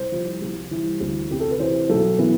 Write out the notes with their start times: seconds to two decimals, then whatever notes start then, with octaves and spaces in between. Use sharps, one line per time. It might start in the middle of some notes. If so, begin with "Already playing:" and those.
Already playing: C2 C5
0.12 F3
0.42 C2
0.71 E3
1.00 D2
1.31 C3 G4
1.40 A4
1.51 B4
1.59 E3 C5
1.89 B1 A4
2.18 E3 B3